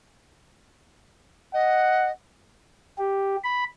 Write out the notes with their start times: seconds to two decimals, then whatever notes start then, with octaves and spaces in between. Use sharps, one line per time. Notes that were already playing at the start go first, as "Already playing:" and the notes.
1.54 D#5 F#5
2.98 G4
3.44 B5